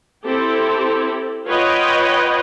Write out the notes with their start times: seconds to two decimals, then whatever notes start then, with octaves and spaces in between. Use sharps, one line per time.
0.25 C4 E4 G4 A4
1.47 F4 B4 C#5 D#5 F#5 G5